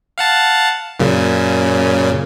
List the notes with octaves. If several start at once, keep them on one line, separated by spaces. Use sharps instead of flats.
F5 F#5 A5
F#2 A#2 C#3